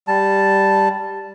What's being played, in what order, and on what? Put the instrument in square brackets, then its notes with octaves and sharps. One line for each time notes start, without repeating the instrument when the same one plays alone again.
[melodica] G3 A5